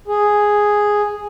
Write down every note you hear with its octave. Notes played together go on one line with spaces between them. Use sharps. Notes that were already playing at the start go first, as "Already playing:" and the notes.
G#4